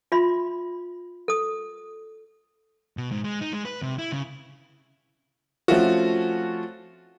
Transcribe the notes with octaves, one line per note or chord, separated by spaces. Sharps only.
F4 E5 B5 C6
A4 D#6
B2
G#2
G#3
D#4
G#3
B4
C3
E4
C#3
F3 A3 C4 C#4 F4 F#4